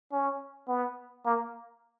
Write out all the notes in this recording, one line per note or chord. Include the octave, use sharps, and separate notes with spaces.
C#4
B3
A#3